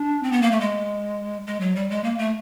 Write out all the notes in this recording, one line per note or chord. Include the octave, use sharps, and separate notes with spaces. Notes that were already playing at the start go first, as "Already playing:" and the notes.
Already playing: D4
C4
B3
A#3
A3
G#3
G#3
F#3
G3
G#3
A#3
A3